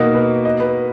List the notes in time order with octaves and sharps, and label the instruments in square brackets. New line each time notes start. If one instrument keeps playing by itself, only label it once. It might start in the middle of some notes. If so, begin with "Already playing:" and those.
Already playing: [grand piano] B2 A#3 D#4 F#4 [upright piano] A#4
[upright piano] B4
D#5
B4